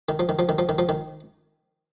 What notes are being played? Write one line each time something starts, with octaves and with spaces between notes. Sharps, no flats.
D#3
F3
D#3
F3
D#3
F3
D#3
F3
D#3